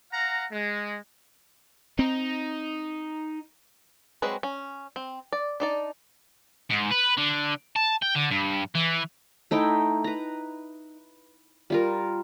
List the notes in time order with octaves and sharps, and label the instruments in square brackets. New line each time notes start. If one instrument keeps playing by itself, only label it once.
[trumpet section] F5 F#5 A#5
G#3
[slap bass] C4 [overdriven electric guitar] D#4
[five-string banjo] F#3 G#3 C4 G#4 B4
C#4
C4
D5
D4 D#4 D5
[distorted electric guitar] G#2
B4
D3
A5
G5
D3
G2
E3
[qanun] A3 D#4 E4 G5
B4 A#5
G3 F4 A#4